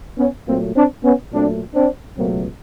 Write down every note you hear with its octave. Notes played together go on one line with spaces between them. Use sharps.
B3 C#4
A#2 F#3 A3 A#3 C4
C4 D4
B3 C#4
A#2 F#3 A3 C4 D4
C4 D4
C#2 B2 F#3 A3 A#3 C4